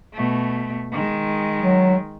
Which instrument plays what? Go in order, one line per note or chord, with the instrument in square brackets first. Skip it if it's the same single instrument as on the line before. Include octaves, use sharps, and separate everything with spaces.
[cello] B2 A3
D#3 G#3
[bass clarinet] F#3